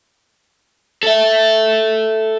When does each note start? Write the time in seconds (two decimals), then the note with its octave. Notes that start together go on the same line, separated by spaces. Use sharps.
1.03 A4 E5